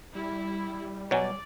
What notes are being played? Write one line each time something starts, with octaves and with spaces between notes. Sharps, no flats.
G3 E4
B2 F#3 C#5 D5 G#5